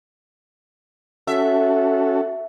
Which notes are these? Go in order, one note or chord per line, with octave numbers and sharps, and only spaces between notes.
C#4 F#4 A4 E5